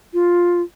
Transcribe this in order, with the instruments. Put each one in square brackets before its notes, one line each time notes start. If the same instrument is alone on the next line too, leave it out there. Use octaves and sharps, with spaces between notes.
[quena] F4